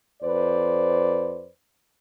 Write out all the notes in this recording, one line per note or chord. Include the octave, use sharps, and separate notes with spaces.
F2 B4 C5 D5